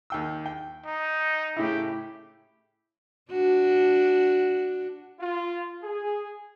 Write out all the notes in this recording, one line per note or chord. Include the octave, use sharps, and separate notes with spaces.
D#2 G5 E6
G5
D#4
A2 C#3 E4 G4
D4 F#4
F4
G#4